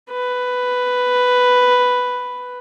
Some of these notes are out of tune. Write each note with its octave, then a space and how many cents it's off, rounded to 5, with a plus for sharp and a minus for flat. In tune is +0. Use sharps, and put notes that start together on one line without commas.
B4 +5